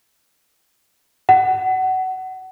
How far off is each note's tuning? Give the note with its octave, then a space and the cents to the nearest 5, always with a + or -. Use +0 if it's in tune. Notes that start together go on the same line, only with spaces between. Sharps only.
F#5 +20